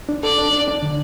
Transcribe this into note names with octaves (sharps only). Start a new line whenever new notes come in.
D4
A4 D5
D4
D4
D4
D3